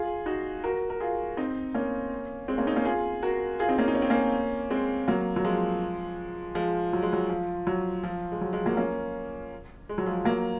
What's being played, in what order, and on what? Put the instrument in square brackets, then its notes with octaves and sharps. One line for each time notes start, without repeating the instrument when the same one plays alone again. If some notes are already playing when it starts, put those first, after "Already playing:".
Already playing: [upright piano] F4 G#4
D#4 F#4
F#4 A#4
A#4
F4 G#4
C4 D#4
A#3 C#4
G#3 C4
A#3 C#4
C4 D#4
A#3 C#4
F4 G#4
F#4 A#4
F4 G#4
C4 D#4
A#3 C#4
D#4
C#4
C4
A#3 C#4
G#3 C4
F#3 A#3
F#3
F3 G#3
F3 G#3
F#3
G#3
F#3
F3
F#3
F3
G#3
F#3
F3 G#3
F#3 A#3
A#3 C#4
G#3
F#3
F3 G#3
F#3 A#3